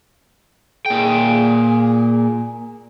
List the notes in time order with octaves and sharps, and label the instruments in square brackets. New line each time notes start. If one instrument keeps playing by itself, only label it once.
[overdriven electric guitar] A#2 G5 [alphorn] G#4